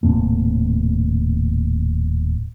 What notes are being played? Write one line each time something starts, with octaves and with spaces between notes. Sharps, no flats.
D#1 A2 C3 A#3